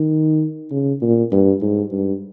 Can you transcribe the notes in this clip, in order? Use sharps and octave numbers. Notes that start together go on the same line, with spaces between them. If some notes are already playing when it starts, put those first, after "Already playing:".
Already playing: D#3
C#3
A#2
G2
G#2
G2